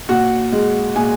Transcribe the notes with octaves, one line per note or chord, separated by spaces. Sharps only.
A#2 F#4 F#5
G#3
A#2 G#4 G#5